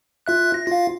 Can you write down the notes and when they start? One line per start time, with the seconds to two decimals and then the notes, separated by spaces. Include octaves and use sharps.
0.26 F4 E5 F#6
0.54 A#6
0.67 F4 F5